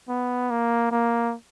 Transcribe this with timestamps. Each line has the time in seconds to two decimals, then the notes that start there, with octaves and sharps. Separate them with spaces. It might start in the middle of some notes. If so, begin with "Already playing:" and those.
0.09 B3
0.50 A#3
0.91 A#3